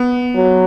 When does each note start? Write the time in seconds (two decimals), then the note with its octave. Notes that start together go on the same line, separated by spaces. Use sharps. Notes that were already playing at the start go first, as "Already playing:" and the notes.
Already playing: B3
0.36 F#3